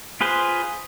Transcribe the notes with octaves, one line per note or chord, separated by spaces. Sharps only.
F4 G#4 B4 C5